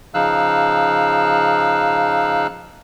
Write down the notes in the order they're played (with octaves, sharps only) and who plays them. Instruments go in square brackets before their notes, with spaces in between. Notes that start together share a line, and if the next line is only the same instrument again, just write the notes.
[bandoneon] C#3 F3 D#4 F5 E6 F#6